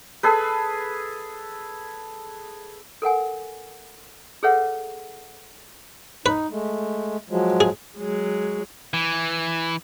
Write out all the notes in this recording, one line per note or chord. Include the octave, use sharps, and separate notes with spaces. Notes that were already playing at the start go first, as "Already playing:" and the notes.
G#4 A4 B4
A4 A#4 F#5 G#5
G#4 A4 B4 C#5 E5 F#5
D#4 B4
G#3 A3
F3 F#3 G#3
G#4
F#3 G#3
E3